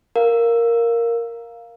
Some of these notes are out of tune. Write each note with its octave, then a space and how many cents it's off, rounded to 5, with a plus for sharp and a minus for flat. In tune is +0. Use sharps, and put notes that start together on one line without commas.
A#4 +0 F5 +0